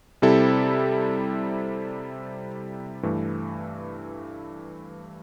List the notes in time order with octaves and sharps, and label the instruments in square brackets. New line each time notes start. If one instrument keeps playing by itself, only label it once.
[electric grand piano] C3 G3 C4 E4 A4
G2 E3 A3